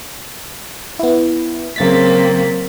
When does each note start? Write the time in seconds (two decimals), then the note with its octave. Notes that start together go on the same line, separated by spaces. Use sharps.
0.99 B3 E4
1.76 C#3 F#3 A#3 C4 A6 B6